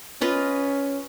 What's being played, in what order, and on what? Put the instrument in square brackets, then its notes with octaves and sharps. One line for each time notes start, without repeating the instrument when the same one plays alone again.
[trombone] C#4 [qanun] F4 B4 D#5